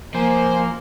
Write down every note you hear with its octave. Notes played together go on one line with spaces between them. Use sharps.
F3 A#3 C5 G#5